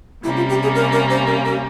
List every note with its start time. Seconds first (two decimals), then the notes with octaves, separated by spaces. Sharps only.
0.24 C3 G3 A#3 C#4 E4
0.36 F4
0.49 G4
0.63 G#4
0.75 A#4
0.92 A#4
1.10 C5
1.27 A#4
1.45 A#4